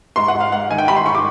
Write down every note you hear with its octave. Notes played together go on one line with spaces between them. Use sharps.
G#2 C6
F#5
G#2
F5
G#2 F#5
D#3 G#5
G5
G3 B5
C6
G#2 C#6
D6